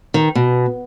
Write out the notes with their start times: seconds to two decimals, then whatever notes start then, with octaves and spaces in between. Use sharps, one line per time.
0.14 D#3
0.35 B2